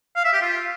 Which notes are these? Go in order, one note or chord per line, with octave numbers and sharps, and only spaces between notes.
F5
E5
G4
F4